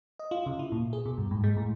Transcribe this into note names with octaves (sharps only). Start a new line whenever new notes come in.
D#5
F4
C#3
E4
A#2
G#4
B2
G2
G#2
G#3
A2